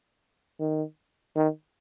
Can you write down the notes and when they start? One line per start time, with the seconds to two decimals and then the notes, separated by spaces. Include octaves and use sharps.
0.60 D#3
1.36 D#3